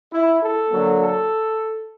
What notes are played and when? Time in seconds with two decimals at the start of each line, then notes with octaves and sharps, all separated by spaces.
0.13 E4
0.42 A4
0.71 D3 F#3 A#3
1.00 A4